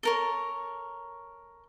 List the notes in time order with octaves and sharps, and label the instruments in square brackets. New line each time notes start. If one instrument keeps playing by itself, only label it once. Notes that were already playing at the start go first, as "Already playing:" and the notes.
[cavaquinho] A4 A#4 C#5